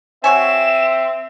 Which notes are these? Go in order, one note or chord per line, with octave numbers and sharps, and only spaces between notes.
C4 F#4 C#5 E5 G#5 E7